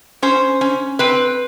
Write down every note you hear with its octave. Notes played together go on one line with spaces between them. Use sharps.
C#4 C5
C#4
C4 B4